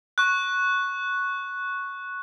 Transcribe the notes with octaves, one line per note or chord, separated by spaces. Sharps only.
C#6 F#6